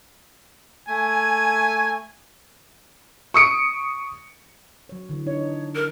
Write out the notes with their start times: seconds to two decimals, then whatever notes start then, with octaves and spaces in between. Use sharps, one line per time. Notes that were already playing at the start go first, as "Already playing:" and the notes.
0.89 A3 G#5
3.34 C#6 D#6 C#7 D7
4.89 F#3 C#5
5.09 D3 E3
5.26 D4 D#4 C#5
5.75 A#4